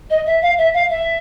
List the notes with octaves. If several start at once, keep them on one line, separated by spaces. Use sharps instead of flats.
D#5
E5
F5
E5
F5
E5